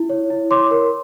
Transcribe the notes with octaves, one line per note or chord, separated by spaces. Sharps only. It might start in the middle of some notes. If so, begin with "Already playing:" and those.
Already playing: E4
C#5
E4
C#5 C6 D6
A#4